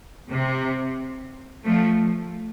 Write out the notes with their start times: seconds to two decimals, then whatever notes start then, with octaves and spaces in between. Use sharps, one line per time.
0.31 C3
1.65 F3 A3